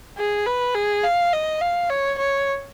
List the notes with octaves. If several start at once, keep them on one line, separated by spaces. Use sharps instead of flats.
G#4
B4
G#4
F5
D#5
F5
C#5
C#5